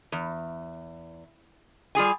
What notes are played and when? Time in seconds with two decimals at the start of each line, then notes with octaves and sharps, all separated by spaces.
0.12 E2
1.95 G3 F4 G#4 G#5